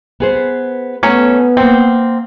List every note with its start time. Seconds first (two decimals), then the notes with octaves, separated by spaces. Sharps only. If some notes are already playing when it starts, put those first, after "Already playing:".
0.20 B3 G#4 C5
1.03 F#3 A3 B3 C#4
1.57 A#3 C4 F#5